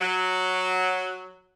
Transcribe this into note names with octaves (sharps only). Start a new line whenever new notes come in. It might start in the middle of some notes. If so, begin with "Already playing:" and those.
F#3